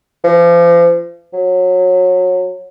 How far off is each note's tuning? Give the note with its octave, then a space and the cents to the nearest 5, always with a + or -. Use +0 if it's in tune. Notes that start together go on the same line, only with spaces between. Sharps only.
F3 -35
F#3 -25